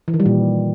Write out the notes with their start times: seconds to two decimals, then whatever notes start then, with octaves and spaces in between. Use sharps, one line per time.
0.08 E3
0.14 D#3
0.20 G3
0.26 A#2